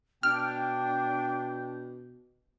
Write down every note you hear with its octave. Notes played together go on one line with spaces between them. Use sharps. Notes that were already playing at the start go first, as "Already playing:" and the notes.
B2 D4 G5 F6